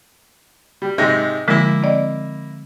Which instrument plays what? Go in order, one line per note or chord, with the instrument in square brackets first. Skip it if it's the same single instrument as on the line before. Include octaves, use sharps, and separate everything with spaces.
[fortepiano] G3
G#2 C3 G#3
[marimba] D3 F3 G#3 [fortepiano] A#3 E4
[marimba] C4 D5 D#5